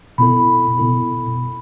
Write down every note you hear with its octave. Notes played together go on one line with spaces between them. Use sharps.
B2 B3 E4 A4 B5
B2 B3 E4 A4